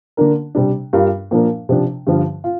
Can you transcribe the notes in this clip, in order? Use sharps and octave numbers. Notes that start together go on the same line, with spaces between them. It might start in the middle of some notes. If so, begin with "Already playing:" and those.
D3 A#3 D4 A#4
C3 G3 D4
G2 G3 D4 F4 A#4
A#2 F3 D4 A#4
C3 F3 D4
G2 D3 F3
F4